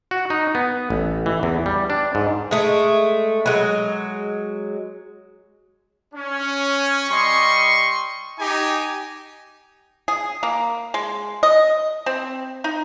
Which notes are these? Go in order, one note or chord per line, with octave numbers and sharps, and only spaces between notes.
F#4
D#4
B3
A1
E3
E2
G3
D4
G#2
G#3 A3
F#3 G#3
C#4
G3 D#5 C6 C#6
D#4 G4 G#5
G#4
A#3
G#3
D#5
C4
D#4